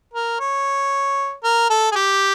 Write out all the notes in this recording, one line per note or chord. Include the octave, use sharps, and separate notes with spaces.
A#4
C#5
A#4
A4
G#4
G4